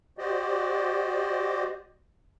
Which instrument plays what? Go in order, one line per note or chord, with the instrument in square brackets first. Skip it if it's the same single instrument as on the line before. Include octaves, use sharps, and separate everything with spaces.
[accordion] F#4 G4 C5 D5 D#5